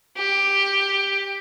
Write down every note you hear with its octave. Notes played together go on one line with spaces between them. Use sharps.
G4